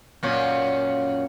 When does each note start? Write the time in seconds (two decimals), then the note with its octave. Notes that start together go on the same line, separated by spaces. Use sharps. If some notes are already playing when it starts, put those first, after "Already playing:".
0.23 F#2 A#2 C#4